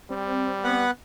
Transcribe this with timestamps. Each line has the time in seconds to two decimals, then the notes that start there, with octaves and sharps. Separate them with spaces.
0.10 G3 C4
0.64 B3 B4 F#5